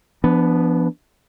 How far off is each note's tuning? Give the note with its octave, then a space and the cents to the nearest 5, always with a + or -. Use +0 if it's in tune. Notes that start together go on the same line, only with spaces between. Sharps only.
F3 -35 B3 +0 D4 +0